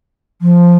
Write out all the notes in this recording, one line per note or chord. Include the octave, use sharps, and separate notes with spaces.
F3